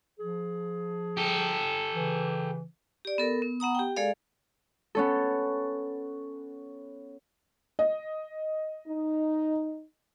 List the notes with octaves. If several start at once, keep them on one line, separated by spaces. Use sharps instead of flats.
F3 G#4
G4 A4
C#3 E3
G4 D5
B3 A4 A#4
B3
B3 F#5 A#5 D#6
G4 G5
G#3 G#4 A4 D5 F5
B3 C#4 A4
D#5
D#4